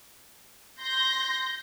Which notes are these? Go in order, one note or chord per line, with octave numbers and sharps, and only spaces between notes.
C6 G6 A#6